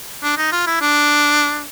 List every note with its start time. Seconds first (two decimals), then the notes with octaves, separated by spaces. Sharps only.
0.23 D4
0.37 D#4
0.52 F4
0.67 E4
0.81 D4